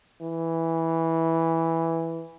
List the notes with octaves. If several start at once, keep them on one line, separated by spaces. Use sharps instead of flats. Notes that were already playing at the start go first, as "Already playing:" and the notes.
E3